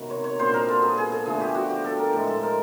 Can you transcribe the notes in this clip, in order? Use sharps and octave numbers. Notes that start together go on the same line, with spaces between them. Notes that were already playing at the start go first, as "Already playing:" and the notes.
Already playing: C3 D#3 F#3 B3
C#5
C#5
A#2 G3 B3 D4 C5
A#4
A4
G#4
G#4
A4
D3 F3 A3 G#4
G4
F#4
G4
A4
A#4
A2 F3 G#3 A4
A4
A#4